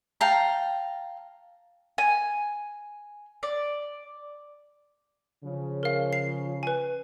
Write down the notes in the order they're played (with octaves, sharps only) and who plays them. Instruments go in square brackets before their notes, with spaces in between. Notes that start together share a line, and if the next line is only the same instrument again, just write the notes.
[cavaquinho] F5 G5 A5 A#5
[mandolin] G#5
D5
[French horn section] C#3 F3
[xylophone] A#4 F5
C7
B4 G#5